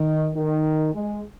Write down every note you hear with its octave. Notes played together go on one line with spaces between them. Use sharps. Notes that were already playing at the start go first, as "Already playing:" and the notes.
Already playing: D#3
D#3
G#3